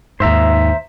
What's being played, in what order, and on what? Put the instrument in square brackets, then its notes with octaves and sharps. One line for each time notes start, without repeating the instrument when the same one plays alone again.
[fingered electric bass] D#2 G#2 [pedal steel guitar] C5 E5 A#5